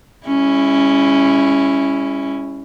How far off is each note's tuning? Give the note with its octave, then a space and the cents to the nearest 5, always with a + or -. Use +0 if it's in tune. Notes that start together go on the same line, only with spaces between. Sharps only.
G#3 -45 C#4 +0 E4 +0